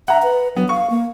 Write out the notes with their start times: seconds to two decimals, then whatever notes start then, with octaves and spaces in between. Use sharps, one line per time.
0.08 E5 F#5 A#5
0.23 B4
0.56 F#3 B3
0.69 F5 C#6
0.90 A#3